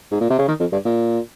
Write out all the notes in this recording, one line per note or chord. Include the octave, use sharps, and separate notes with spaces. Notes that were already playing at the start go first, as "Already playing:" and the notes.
G#2
A#2
C3
C#3
D#3
F2
G2
A#2